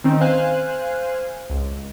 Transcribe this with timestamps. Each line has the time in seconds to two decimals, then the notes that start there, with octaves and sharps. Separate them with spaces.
0.04 D#3 C4 C#4 D#4
0.20 C5 F5 G#5 F#6
1.50 C#2